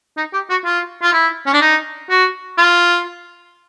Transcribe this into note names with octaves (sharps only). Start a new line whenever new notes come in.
D#4
G4
F#4
F4
F4
E4
C#4
D4
D#4
F#4
F4